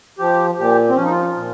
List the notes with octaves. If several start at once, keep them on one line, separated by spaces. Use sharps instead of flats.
F3 G4
A#2 G4
C4
F3 C#4
D#4
F4
A#2